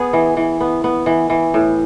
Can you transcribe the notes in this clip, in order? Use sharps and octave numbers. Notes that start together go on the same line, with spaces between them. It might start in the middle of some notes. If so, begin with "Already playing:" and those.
Already playing: B3 G#4
E3
E3
B3
B3
E3
E3
A2